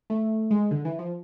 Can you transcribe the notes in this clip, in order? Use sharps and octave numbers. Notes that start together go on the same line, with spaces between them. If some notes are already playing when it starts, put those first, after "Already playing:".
A3
G#3
D3
E3
F3